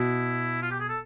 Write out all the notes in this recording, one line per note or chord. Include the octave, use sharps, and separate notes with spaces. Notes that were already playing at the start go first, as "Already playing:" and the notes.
Already playing: B2 E4
F4
G4
G#4
A4